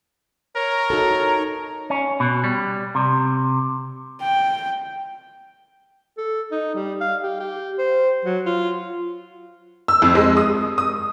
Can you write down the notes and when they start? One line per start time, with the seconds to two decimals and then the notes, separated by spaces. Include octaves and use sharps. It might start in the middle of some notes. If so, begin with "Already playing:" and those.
0.56 A#4 C#5 A#5
0.90 D#4 F#4 A4
1.90 C#4
2.20 B2
2.44 G3
2.95 C3
4.21 G5
6.18 A4
6.52 D#4
6.75 G3
7.01 F5
7.23 G4
7.40 G4
7.78 C5
8.25 F#3
8.46 F4
9.88 E6
10.02 F2
10.15 G#3
10.37 D#6
10.78 D#6